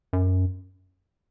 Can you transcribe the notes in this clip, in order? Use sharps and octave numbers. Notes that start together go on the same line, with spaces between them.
F#2